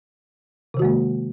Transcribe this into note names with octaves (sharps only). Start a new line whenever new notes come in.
C3 D#3 G#3 A#3 F#4